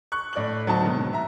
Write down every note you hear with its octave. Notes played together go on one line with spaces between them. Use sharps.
C#6 F#6
A2 D5 F#6 F#7
D1 F#3 C4 D#4 A5
G#2 B2 D#3
E5 A#5